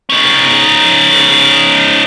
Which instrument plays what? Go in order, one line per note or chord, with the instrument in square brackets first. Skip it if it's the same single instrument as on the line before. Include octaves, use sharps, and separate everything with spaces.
[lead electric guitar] C#4 D#4